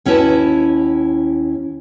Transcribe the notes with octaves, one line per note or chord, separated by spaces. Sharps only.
D#2 C#4 E4 F#4 B4 A5